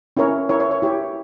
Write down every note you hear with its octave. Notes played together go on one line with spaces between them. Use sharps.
C#4 E4 A#4 C#5
E4 A#4 C#5
C#5
C#5
E4 G4 C#5